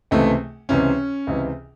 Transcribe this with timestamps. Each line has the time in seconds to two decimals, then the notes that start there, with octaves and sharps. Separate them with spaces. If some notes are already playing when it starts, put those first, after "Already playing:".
0.11 C#2 C3 E3 A3
0.69 C#2 C3 E3 C#4
1.27 C#2 C3 E3